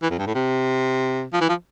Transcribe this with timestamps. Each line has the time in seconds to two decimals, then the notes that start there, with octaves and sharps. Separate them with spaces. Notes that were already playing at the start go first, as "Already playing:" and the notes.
0.02 E3
0.10 F2
0.18 G2
0.27 A2
0.35 C3
1.33 F3
1.41 E3
1.49 F3